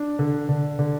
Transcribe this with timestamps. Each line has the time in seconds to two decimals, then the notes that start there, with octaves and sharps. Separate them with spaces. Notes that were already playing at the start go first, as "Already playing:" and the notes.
Already playing: D4
0.19 D3
0.49 D3
0.79 D3